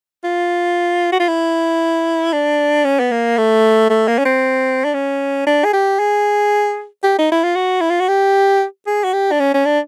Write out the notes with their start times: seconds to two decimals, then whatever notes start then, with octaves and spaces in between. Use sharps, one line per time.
0.24 F4
1.12 F#4
1.20 F4
1.28 E4
2.33 D4
2.85 C#4
3.00 B3
3.11 A#3
3.38 A3
3.90 A3
4.08 A#3
4.19 C#4
4.25 C4
4.84 D4
4.94 C#4
5.47 D4
5.65 G#4
5.73 G4
5.99 G#4
7.03 G4
7.19 D#4
7.32 E4
7.44 F4
7.56 F#4
7.81 E4
7.90 F4
8.00 F#4
8.08 G4
8.87 G#4
9.04 F#4
9.13 G4
9.32 D4
9.40 C#4
9.54 C#4
9.66 D4